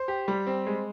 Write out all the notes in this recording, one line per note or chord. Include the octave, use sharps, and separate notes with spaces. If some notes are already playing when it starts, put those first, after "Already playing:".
Already playing: C5
G4
G3
C4
G#3